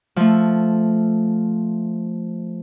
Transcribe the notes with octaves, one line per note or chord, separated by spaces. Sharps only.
F3 A3